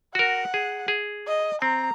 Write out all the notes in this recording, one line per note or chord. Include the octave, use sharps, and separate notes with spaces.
F#4 A#4 F#5
G#4
G#4
D#5
C4 A#5